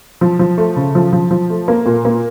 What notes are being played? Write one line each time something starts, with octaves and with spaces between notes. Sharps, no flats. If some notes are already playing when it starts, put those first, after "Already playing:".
F3
F3
A3
C#3
F3
F3
F3
A3
A#3
A#2
A#3